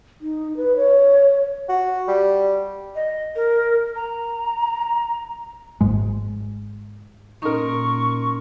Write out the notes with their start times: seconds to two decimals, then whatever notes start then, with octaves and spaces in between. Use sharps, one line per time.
0.21 D#4
0.57 B4
0.77 C#5
1.69 F#4
2.08 G3
2.95 D#5
3.36 A#4
3.96 A#5
5.81 G#1 G#2 G#3
7.42 A#2 C#4 D#4 A#4 C6 C#6